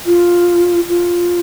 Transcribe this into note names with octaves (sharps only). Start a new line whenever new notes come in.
F4
F4